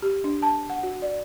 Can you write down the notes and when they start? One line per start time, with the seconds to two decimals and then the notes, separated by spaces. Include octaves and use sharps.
0.02 G4
0.24 D4
0.42 A5
0.70 F#5
0.83 F#4
1.02 D5